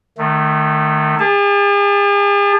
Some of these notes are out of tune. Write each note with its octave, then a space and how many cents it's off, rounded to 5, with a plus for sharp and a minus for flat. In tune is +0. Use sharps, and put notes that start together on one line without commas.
D#3 -25 A3 +0
G#4 -45 A5 -15